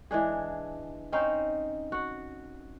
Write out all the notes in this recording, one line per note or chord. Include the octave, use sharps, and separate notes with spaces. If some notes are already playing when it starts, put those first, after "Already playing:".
E3 G#3 D4 G#4
C4 C#4 D#4 C5
F#4 F#5